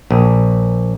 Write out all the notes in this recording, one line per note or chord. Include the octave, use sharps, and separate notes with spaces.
A#1